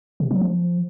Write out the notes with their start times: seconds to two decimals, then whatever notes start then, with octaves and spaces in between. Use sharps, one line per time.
0.20 C3
0.31 F#3
0.41 F3